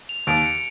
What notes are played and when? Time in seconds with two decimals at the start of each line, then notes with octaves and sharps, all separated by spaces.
0.09 F7
0.27 D#2 D7
0.45 C#7